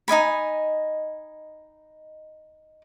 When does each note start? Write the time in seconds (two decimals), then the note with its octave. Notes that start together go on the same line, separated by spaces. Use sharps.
0.08 D#4 D#5 G#5 B5